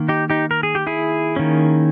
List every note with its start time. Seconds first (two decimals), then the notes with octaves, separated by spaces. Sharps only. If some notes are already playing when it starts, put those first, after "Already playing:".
Already playing: D#3 A#3
0.09 D#4 G4
0.30 D#4 G4
0.51 A#4
0.63 G#4
0.75 G4
0.87 E4 G#4
1.36 D#3 A#3 C#4